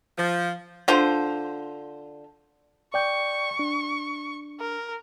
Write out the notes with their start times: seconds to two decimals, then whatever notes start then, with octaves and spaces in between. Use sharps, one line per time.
0.18 F3
0.88 D3 F4 C5
2.94 D5 G5 C#6 G6
3.59 D4
4.60 A#4